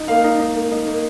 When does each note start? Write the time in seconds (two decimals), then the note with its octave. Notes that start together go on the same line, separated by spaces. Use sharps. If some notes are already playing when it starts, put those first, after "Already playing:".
Already playing: D#4
0.08 A#3 F5
0.24 D#4
0.40 D#4
0.55 A#3
0.71 D#4
0.87 A#3